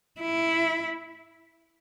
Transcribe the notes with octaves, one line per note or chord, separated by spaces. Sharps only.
E4